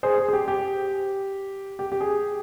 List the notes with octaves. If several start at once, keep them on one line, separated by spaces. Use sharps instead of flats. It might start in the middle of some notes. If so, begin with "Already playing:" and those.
G#4 C5
G#4
G#4
G4
G4
G4
G4
G#4